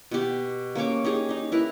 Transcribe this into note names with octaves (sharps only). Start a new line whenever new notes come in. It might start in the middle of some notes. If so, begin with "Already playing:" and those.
B2 G4
A#3 C#4 C#5 D6
D#4 G4 G#4
D#4 G4
E4 A#4 B4